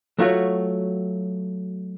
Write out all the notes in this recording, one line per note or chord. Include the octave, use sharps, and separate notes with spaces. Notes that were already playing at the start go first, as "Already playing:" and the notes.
F#3 A3 F4 F#4 C#5